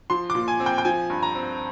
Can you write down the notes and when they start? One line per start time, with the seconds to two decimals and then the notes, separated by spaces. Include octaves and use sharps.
0.10 F3 C6
0.30 D6
0.35 A#2
0.48 G#5
0.60 C4
0.66 G5
0.78 G5
0.85 F3 G#5
1.10 G2
1.23 A#5
1.35 C4